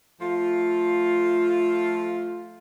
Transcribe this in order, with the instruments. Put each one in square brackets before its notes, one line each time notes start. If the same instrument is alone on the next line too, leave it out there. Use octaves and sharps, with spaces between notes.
[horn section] F3 A3 F4